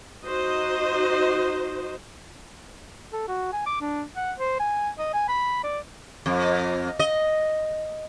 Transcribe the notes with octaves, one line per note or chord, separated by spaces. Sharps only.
D#4 F#4 C5 D#5
A4
F#4
G#5
D6
D4
F#5
C5
G#5
D#5
G#5
B5
D5
F2
D#5